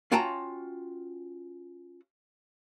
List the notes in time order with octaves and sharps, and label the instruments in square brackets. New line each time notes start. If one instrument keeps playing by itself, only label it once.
[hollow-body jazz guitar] C#4 F4 F#4 G5 A5 A#5